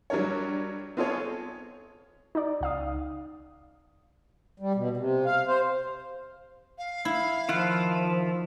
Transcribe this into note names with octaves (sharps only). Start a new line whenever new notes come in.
F#3 G3 D4 A#4 C#5
B3 C4 F4 G#4 A4 C#5
D#4 D5
C#2 F5 D#6
G3
B2
C3
F5
C5
F5
E4
D#3 F3 E4 F4 F#5